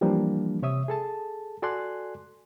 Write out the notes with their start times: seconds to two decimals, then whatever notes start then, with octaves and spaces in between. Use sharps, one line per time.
0.01 E3 F3 G3 A#3 D4
0.62 C3 C#5 E5 D#6
0.88 G#4 A4 A5
1.62 F#4 A4 D5 G#5 C6 F#6